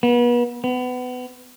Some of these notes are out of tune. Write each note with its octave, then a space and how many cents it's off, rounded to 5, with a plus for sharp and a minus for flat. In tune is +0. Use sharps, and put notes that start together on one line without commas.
B3 -35
B3 +25